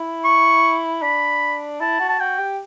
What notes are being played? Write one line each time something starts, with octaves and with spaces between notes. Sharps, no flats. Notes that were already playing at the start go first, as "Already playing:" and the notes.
Already playing: E4
C#6
D4 B5
E4 A5
F#4
A5
F#4 G5
G4